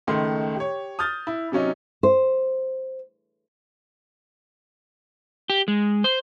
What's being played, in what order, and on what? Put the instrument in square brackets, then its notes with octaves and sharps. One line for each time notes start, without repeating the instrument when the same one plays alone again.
[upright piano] C#2 D#3 A3 C6
G4 C#5
D#6 F6 G6 A6
E4
C3 F#3 C#4 D#4
[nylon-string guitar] C5
[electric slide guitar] G4
G#3
C5